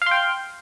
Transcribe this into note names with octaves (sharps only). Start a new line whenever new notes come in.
F5 G5 C6